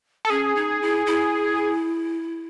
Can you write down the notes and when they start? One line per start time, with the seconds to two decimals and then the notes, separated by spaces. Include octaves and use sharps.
0.25 A4
0.30 C#4 G#4
0.56 D#4
0.82 E4
1.07 E4